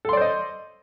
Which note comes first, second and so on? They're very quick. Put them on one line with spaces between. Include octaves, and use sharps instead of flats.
A4 C6 D5 C5 D#5